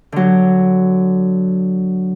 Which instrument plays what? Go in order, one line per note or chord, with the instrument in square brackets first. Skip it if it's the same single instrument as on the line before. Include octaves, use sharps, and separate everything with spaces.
[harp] D3 F#3